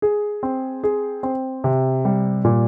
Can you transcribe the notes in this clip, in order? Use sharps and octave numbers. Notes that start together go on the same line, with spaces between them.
G#4
C4
G#4
C4
C3
G3
A#2